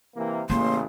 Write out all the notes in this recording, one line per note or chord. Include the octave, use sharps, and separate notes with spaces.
C3 E3 A#3
A1 C#3 A#3 C6